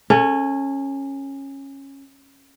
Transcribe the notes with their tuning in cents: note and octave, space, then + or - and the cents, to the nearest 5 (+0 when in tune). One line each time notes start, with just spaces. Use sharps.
C#4 -15 A4 +25